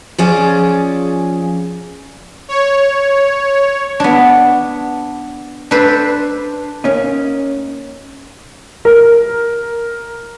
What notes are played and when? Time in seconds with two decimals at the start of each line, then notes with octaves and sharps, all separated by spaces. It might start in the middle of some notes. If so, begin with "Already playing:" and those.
0.18 F3 C#4 G#4 D5
2.48 C#5
4.00 B3 D4
5.71 D4 A4 B4 C5
6.84 A#3 C#4 D#4
8.85 A#4